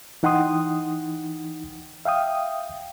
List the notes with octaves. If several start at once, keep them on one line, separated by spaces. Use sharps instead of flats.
E3 D#4 F#5 G5 C6 D#6
E5 F5 G5 D#6